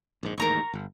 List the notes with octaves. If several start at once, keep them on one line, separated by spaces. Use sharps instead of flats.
A#1 G#2
A1 D#2 G#2 A#4 A#5 C#6
G1